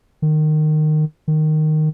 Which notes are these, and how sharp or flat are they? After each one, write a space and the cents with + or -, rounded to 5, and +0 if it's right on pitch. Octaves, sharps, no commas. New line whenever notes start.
D#3 -20
D#3 -10